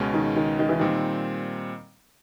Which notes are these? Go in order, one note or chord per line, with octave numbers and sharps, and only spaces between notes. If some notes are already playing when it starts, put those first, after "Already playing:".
Already playing: C#2 B2 G#3 C#4
D#3
D#3
D#3
E3
A#2 D#3 G3 C4